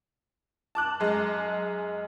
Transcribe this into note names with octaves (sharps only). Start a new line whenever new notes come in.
A5 D6 F#6
F#2 G#3